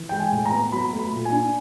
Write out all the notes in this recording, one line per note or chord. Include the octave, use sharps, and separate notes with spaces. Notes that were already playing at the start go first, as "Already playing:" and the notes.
Already playing: E3
G#3 G5
G#5
A2
A#5
B3
F#3 B5
A3
B5
A#2
G#5
D4